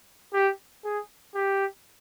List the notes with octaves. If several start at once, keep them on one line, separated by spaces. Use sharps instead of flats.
G4
G#4
G4